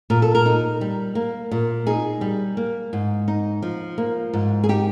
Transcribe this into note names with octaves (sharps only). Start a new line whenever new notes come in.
A#2 A#4
A4
A#4
D#4
G3
A#3
A#2
D#4 G#4
G3
A#3
G#2
D#4
F3
A#3
G#2
G#4
D#4 G4